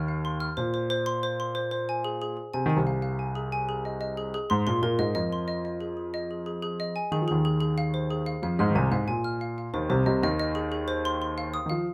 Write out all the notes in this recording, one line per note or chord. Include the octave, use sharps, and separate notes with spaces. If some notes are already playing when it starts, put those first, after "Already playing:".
Already playing: D#2 D#3 F6
F5
C6
F6
A#2 C5
C5
C5
C6
C5
C6
C5
C5
G#5
G#4
G#4
G#4
C3 G#5
D#3 G#5
C2 C3
F5
F5
G#5
G#4
G#5
G#4
D#5
D#5
G#4
G#4
G#2 C6
A#2 C6
A#2 A#4
G#2 G#3 D#5
F2 F3 D#5
C6
D#5
D#5
G#4
G#4
D#5
G#4
G#4
G#4
D#5
G#5
D#3 G#4
F3
D#2 D#3 G#4
G#4
G#4
F5
C5
G#4
F5
F2 F3 F5
G#2 G#3 F6
D#3
C2 C3 G#5
G#2 F5
A#2 G#5
F6
F5
F5
D#2 D#3 C5
C2 C3 C5
C2 C3 D#5
D#2 D#3 D#5
D#5
G#4
G#4
C5
C6
C6
F5
D#6
D#3
F3 F5